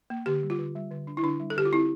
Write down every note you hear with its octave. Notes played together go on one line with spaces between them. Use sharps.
A#3
D3 G4
G3
F4
D3
G3
D3
D4
E4
D3 D4
G3
A4
D3 G4
F4
C4 E4